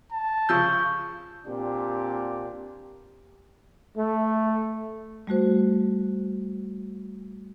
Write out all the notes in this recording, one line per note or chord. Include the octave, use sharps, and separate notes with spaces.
A5
C#3 F3 C#6 E6 G6
A#2 C4 D4 G4
A3
G3 A3 F#4 C5